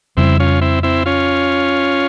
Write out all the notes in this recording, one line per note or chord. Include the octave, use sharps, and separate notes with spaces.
F2 C#3 G3 C4 E4
C#4 F4
C4 E4
C4 E4
C#4 F4